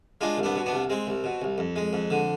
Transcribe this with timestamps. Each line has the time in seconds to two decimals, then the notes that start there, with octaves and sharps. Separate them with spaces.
0.21 G#3 D4 F4
0.37 C2
0.43 B3 D4
0.56 B2
0.66 B3 D4
0.73 C2
0.90 G#3 C4
1.07 C2
1.24 B2
1.42 C2
1.58 F2
1.76 G#3
1.93 F2
2.10 D3